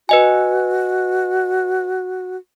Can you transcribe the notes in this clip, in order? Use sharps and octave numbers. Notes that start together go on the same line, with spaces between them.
F#4 B4 D#5 G#5